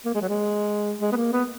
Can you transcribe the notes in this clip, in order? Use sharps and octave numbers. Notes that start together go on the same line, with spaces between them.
A#3
G#3
F#3
G#3
G#3
B3
A#3
B3